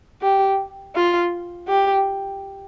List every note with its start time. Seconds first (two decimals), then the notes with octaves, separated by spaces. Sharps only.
0.22 G4
0.95 F4
1.68 G4